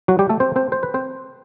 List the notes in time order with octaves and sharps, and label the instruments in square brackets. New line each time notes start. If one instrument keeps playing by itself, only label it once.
[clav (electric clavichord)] F#3 F#4
G3 G4
A3 A4
C4 C5
C4 C5
C5
B4
C4 C5